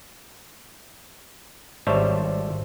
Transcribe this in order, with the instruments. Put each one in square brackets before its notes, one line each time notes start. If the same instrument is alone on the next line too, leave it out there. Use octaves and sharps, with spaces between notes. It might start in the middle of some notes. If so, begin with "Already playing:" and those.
[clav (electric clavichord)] G#1 G3 C5 C#5 E5 A5